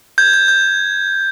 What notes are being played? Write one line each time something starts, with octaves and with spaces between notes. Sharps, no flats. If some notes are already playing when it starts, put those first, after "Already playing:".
G6 G#6
G6
G6